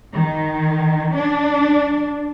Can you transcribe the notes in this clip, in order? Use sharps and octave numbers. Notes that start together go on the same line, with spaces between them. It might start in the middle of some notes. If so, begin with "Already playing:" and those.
D#3
D4